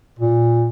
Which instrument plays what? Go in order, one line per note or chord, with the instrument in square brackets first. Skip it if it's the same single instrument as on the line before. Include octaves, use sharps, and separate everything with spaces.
[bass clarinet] A#2